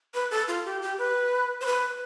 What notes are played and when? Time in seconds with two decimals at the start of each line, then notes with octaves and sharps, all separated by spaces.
0.14 B4
0.31 A4
0.48 F4
0.65 G4
0.82 G4
0.98 B4
1.61 C5
1.66 B4